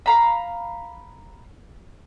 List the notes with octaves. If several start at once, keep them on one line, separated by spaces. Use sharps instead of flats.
F5 A#5 B5